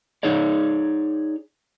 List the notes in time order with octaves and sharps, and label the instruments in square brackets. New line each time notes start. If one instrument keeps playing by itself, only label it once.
[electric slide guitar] D#4 G#4 C#5 D5